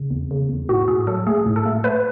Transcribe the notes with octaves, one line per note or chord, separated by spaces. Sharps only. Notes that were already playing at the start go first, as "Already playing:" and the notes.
Already playing: C#3
E2
C#3
E2
A2 F#4
A2 G#4
F#3 A4
A3 G#4
A2
A4
A3
A3 B4